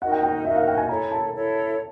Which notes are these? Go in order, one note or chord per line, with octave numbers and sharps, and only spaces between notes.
D#4 F#4 A#4 D#5 F#5
G5
G5
D#4 F#4 A#4 D#5 E5
F5
G5
G#5
E4 A4 C#5 A#5
A5
E4 A4 C#5